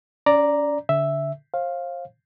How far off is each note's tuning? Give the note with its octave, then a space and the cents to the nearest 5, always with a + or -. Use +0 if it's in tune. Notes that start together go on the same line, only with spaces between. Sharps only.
C#4 +40 D5 +0 A#5 +0
D3 -30 E5 +0
C5 +35 F5 +0